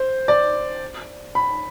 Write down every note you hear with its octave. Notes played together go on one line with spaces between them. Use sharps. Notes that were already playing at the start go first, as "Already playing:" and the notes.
Already playing: C5
D5
B5